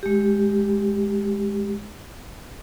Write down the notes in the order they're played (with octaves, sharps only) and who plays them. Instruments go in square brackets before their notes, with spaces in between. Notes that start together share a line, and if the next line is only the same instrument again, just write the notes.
[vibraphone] G#3 G4